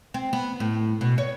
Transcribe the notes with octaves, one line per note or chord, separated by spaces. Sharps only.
C4
B3
A2
B2
C#5